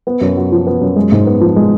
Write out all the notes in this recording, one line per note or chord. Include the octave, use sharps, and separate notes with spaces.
B3
F#2
F#4
F3
B3
F#2
G#3
G#2
B3
F3
G#3